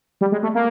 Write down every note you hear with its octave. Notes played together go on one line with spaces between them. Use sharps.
G3
G#3
A3
A#3